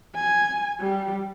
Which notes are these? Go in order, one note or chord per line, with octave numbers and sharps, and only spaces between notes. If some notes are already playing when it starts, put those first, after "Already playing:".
G#5
G3